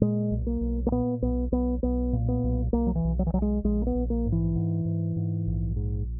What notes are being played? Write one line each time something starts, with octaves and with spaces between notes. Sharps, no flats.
A#2 G#3
B1
A#3
B1
A#3
A#2 B3
B1 B3
B1 B3
B1 B3
A#2
B3
B1
B1 A#3
F#3
E3
B1
F#3
E3
B1 F#3
G#3
A#1 G#3
A#3
B3
A#1
A#3
G#2
E3
G#2
G#2
G#2
A#1
G#2